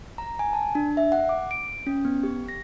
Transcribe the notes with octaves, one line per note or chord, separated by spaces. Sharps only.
A#5
G#5
A5
D4
E5
F#5
D6
D7
C#4
B3
G4
A#6